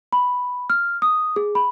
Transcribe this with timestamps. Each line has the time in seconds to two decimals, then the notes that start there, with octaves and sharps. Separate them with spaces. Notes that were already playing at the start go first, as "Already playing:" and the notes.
0.13 B5
0.70 F6
1.02 D#6
1.36 G#4
1.55 B5